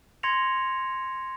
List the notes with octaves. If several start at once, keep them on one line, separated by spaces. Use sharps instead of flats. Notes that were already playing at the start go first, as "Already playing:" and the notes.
C6 G#6 A#6 C#7 F7